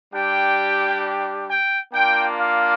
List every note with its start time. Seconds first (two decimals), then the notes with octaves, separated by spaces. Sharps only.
0.14 G3 D4 G4 G5
1.49 G5
1.93 A#3 D4 F4 G5
2.38 F5